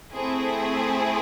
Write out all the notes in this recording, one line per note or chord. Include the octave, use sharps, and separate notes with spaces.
A3 C4 E4 G#4